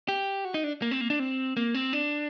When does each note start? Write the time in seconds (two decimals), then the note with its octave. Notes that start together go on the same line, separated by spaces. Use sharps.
0.08 G4
0.45 F#4
0.54 D#4
0.64 D4
0.82 A#3
0.91 C4
1.01 A#3
1.10 D4
1.19 C4
1.57 A#3
1.74 C4
1.93 D4